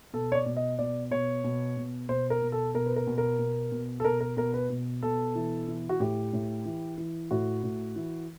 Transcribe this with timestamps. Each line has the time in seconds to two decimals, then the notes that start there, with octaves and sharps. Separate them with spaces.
0.13 B2 A4
0.32 C#5
0.35 D5
0.46 B2
0.56 D#5
0.79 B2 D5
1.11 B2 C#5
1.44 B2
1.77 B2
2.09 B2 C5
2.30 A#4
2.42 B2
2.52 A4
2.74 B2 A#4
2.86 B4
2.96 A#4
3.07 B2
3.18 A#4
3.39 B2
3.72 B2
4.00 A4
4.05 B2 A#4
4.20 A#4
4.37 B2 A#4
4.54 B4
4.70 B2
5.03 B2 A4
5.35 E3
5.68 E3
5.89 F#4
6.00 A2 G4
6.33 A2
6.66 E3
6.98 E3
7.31 A2 F#4
7.63 A2
7.96 E3